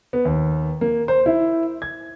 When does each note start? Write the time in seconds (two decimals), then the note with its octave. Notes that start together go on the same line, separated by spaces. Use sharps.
0.13 B3
0.25 D#2
0.81 A#3
1.08 C5
1.26 E4
1.82 G#6